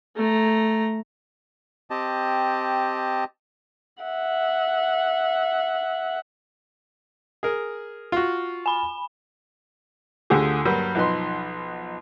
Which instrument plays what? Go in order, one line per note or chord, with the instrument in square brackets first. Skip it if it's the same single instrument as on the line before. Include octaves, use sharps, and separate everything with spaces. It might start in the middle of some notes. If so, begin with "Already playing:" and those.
[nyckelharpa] A3 A#5
[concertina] C4 G4 D#5 A5
[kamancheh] E5 F#5
[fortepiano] G#4 A#4
F4 F#4
[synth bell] G#5 B5
[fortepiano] D2 D3 F4 G4 G#4
G2 F#3 G3 A#3
B1 F3 D#4 B4 C6